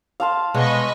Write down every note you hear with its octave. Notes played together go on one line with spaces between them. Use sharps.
F5 A5 C6
B2 G#3 C#5 D#5 B5 C#6